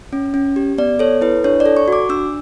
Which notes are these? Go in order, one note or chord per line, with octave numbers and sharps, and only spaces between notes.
C#4
C#4
G4
B3 D5
A4 C#5
E4 B4
D4 C#5
D5
A4
C#6
F#4 D6
D4 E6